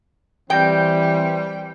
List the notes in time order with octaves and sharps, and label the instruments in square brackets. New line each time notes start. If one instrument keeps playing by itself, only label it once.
[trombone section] E3 C4 [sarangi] G3 [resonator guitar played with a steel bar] G5